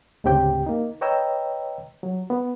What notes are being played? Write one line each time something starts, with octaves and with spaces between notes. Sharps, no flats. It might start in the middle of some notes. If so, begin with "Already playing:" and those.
D2 G#2 C#3 C4 G4 G5
A#3 D#4
B4 C#5 D#5 G5 A#5 E6
F#3
B3